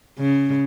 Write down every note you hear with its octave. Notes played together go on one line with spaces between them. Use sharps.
C#3